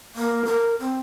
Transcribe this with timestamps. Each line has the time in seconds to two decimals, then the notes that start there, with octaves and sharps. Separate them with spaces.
0.15 A#3
0.46 A#4
0.79 C4